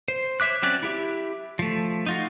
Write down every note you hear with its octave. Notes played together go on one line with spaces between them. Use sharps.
C5
C5 C#5 E5 D6 F#6
F#3 C4 C#4 D5 F#6
E4 G4 E5
F3 A3
D#4 F4 F#4